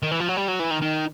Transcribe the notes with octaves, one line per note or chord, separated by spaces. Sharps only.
D#3
E3
F3
F#3
G3
F#3
E3
D#3
D#3